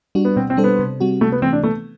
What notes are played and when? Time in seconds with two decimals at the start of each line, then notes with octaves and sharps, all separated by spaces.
0.15 G3 D4 F#4
0.25 B3
0.37 B2 C4
0.50 C4
0.57 G3 D4 A4 C5
0.64 B3
0.79 C3
1.00 G3 C4 F#4
1.21 C3 A3
1.32 B3
1.42 E3 C4
1.45 A3
1.53 D4
1.63 A3 B3